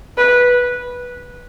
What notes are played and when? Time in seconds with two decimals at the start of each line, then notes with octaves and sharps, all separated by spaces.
0.18 B4